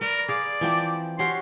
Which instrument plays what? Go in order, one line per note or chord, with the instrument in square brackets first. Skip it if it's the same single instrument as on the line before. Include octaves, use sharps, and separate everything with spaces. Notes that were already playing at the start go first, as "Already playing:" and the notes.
[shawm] A#4 [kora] B4 D5
[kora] G#4 F5 [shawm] D5
[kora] E3 F3 C4
[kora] C#4 F#4 G4 [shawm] C6